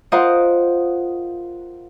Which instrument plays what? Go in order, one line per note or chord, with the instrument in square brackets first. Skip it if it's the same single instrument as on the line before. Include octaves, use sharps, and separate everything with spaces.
[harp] F4 A#4 C5 D#5 F5 F#5